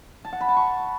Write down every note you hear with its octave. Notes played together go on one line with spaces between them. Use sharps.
A5
F#5
B5
A5
C#6